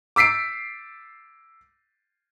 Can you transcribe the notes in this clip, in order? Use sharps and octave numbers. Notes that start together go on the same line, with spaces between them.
D6 E6 B6 C7 D7